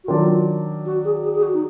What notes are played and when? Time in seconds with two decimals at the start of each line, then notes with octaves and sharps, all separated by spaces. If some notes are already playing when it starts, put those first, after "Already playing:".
0.04 F#4
0.08 D#3 F#3 D4 F4
0.85 F#4
1.04 G#4
1.23 G#4
1.35 G#4
1.43 F#4
1.53 D#4